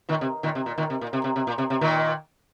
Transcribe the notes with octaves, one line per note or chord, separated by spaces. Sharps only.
A#2 D#3
C3
A#2 D#3
C3
A#2
A#2 D#3
C3
A#2
C3
C3
C3
A#2
C3
C3
A#2 D#3